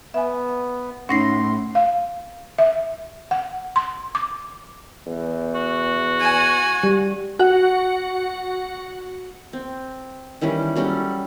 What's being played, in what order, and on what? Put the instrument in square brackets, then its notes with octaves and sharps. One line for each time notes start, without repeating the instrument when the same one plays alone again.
[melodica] B3 [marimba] E5 G#5
[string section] A2 [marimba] C#4 D#4 [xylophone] F#5 A#6 C7 [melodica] C6
[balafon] F5
E5
F#5
C6
D6
[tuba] E2
[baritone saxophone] F#4
[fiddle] G#5
[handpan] G3
[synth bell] F#4 F#5
[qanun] C4
D#3 E3 G3 C#4
F#3 G3 C#4 A4